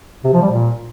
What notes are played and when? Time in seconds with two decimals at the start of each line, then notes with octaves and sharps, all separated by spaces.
0.24 C3
0.33 F3
0.42 G3
0.51 A#2